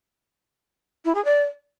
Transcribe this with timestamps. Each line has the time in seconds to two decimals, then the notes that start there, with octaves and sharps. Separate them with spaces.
1.05 E4
1.15 G#4
1.25 D5